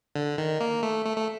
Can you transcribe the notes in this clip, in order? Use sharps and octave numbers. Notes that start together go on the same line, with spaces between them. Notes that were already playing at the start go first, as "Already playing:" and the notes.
D3
D#3
A#3
A3
A3
A3